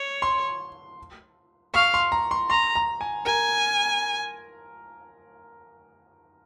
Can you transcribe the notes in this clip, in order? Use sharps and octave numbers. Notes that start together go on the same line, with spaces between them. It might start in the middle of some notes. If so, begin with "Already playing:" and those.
Already playing: C#5
C6
F5 C#6
C6
A#5
C6
A#5 C6
A#5
G#5
A#4 G#5